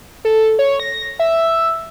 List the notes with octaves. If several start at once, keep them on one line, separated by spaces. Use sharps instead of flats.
A4
C#5
A#6
E5